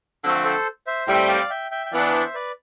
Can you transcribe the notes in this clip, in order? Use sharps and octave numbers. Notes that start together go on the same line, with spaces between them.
D3 F3 A3 C4
A4 C5
C5 E5
A2 G3 C4 E5 G5
D5 F5
E5 G5
E5 G5
G5
E3 B3 D4 D5 F5
F5
C5 E5
B4 D5